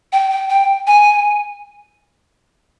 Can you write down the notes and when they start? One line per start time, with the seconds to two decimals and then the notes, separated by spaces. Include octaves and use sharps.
0.12 G5
0.31 G5
0.49 G5
0.87 G#5